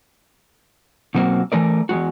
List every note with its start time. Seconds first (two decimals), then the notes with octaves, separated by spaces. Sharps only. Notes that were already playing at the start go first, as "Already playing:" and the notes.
1.15 B2 F#3 A#3 C4 F#4
1.52 E3 A3 A#4 D5
1.89 E2 G#2 G#3 F#4